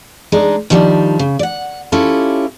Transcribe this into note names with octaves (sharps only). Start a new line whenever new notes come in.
G#3 D4 D#4
D#3 F3 G3 C#4 D4
C#3
D5 F#5
C#4 E4 F4 G4 A4